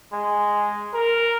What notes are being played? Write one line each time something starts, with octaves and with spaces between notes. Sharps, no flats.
G#3
A#4